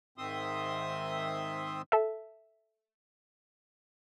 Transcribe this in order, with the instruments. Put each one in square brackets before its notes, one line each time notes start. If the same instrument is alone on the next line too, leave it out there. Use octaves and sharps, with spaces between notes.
[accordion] G#2 D#3 C4 E5 C6 D#6
[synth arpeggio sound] A4 E5